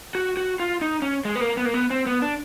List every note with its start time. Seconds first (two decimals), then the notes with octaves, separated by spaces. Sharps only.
0.15 F#4
0.37 F#4
0.60 F4
0.81 D#4
1.02 C#4
1.25 G#3
1.36 B3
1.41 A#3
1.57 B3
1.65 A#3
1.74 B3
1.90 C4
2.06 B3
2.22 D4